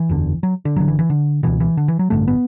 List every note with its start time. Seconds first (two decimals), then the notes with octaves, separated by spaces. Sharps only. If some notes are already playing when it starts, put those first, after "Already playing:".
Already playing: E3
0.09 F#1 E2 D3
0.43 F#3
0.65 D3
0.76 G1 G2 D3 F#3
0.88 E3
0.99 E3
1.10 D3
1.43 C#2 B2 E3
1.60 E3
1.77 D3
1.88 E3
1.99 F#3
2.10 A1 G2 D3 A3
2.28 B3